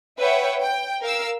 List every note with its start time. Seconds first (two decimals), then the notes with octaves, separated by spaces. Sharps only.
0.19 B4 C#5 E5 F#5 G5
0.62 G5
1.02 A#4 F5 E6